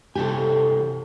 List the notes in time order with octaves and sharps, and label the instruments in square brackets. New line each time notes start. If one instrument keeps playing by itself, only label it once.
[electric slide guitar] C3 E3 G#5 [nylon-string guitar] G4 A4